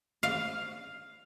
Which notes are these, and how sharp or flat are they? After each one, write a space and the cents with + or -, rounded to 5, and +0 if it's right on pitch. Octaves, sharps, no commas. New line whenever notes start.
F5 +5